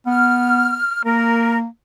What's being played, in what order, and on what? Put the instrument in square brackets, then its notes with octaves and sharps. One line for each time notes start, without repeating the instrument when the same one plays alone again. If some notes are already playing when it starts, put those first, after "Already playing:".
[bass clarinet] B3 [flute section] F6
[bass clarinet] A#3 [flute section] A#4